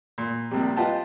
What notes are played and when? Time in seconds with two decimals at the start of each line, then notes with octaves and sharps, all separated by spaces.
0.18 A#2
0.51 A#1 C3 G3
0.76 F4 B4 D#5 F#5 G5 A5